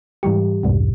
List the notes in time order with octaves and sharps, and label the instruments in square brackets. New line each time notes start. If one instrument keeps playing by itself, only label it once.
[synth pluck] G#2 E3 G3 G4
C2 F2 G#2 C3